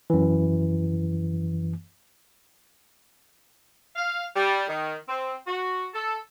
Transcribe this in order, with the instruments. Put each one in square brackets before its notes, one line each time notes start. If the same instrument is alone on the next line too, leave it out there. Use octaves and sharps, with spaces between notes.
[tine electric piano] F#2 E3
[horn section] F5
G3
D#3
C4
F#4
A4